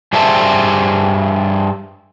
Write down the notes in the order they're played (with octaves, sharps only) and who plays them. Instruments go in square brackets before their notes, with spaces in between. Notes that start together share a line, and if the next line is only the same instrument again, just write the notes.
[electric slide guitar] G2 G3 G#4 C5 E5 A5